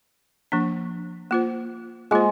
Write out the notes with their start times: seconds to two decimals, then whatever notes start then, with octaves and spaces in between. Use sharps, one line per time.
0.52 F3 A#3 D4
1.31 A#3 F4 C5
2.11 G#3 A#3 F4 C5